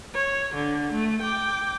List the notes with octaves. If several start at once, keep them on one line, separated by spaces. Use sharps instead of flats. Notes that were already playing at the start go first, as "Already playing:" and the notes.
C#5
D3
A3
G5 D6